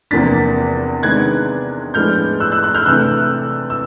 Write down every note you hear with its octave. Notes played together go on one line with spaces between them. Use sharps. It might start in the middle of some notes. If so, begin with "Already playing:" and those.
E2 C3 F3 A#3 D4 A6 B6
C3 D#3 G#3 B3 D4 F#6 G#6
A2 F3 G#3 B3 D4 F6 G6
E6 F#6
E6 F#6
E6 F#6
F6 G6
C3 E3 A3 D4 E6 F#6
E6